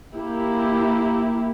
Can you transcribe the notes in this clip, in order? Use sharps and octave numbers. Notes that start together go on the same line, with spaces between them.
A#3 E4 G4